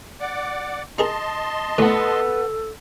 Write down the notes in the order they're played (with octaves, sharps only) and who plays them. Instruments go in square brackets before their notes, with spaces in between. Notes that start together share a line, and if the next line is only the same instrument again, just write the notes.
[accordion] D5 F#5 D6
[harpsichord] D#4 G#4 A#4 [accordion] D#5 A5 C6
[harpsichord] A2 D3 [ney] A4 [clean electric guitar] B4 F#5